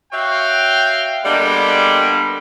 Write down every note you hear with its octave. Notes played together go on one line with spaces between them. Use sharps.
F#4 C#5 E5 F5 G5
D3 G3 G#3 A#3 B3